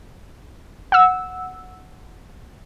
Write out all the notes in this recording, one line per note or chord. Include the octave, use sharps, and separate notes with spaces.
F#5 E6